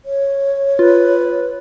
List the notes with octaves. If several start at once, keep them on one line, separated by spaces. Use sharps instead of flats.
C#5
F4 B4